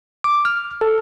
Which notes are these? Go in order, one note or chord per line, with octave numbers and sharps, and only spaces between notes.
D6
F6
A4